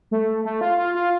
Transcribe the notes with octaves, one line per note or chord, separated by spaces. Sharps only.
A3
A3
F4
F4
F4